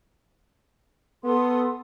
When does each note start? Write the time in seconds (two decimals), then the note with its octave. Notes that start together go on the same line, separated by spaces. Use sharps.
1.24 B3 A4 C6 D#6